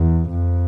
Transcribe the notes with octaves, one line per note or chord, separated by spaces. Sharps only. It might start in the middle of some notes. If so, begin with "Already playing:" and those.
Already playing: E2
F2